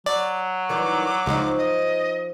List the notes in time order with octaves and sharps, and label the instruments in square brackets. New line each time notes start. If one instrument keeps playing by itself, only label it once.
[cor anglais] F#3 [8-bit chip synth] D5
[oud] D#3 E3 G3 [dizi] D6
[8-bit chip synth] C#2 [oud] F3 D#4
[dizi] D#5